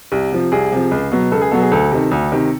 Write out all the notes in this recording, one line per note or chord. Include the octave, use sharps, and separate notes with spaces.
C2
C3 F3
C2 G#4
C3 F3
C#2
B2 F#3
C#2 A4
G#4
B2 F#3 A4
G#4
D2 A4
C3 D#3
D2
C3 D#3